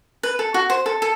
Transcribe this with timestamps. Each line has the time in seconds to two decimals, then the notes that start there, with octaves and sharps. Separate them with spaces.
0.23 B4
0.39 A4
0.54 F#4
0.70 C5
0.86 A4
1.02 A4